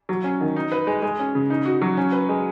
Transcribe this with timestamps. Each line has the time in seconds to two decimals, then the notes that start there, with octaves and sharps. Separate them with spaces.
0.09 F#3
0.24 C#4
0.41 D#3
0.56 D#4
0.72 B4
0.87 G#3
1.02 G#3
1.19 C#4
1.35 C#3
1.50 D#4
1.66 F#4
1.82 F#3
1.97 C#4
2.12 B4
2.29 G#3